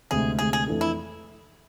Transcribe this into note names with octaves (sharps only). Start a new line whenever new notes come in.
D2 C3 G#3 G#4
D2 C3 G#3 G#4
G#4
F2 E3 A3 D4 A4
E4